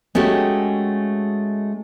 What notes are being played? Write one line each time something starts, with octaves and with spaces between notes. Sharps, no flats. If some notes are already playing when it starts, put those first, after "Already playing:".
G#3 A3 C#4 F#4 G4